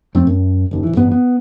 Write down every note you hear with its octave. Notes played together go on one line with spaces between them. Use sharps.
F2 F3 A3 C4
F#2
F#1 D#2
D1 E3
A1 G2 B3
B3